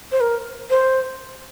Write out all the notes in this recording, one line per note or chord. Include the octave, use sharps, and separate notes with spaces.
C5
A#4
C5